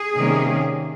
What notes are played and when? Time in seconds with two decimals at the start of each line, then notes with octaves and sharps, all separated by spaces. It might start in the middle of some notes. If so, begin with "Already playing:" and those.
Already playing: G#4
0.14 C3 D#3 G3 A#3 C#4